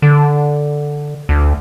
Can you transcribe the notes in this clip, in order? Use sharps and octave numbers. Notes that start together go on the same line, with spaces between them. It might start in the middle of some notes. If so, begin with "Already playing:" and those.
D3
D2